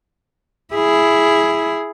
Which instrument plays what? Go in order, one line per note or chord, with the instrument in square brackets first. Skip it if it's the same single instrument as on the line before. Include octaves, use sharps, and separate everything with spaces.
[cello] E4 G#4